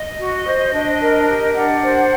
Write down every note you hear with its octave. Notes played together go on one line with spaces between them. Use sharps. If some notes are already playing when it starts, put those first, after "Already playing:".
Already playing: D#5
F#4
C5
D4
A#4
G4
D4 F#5
C5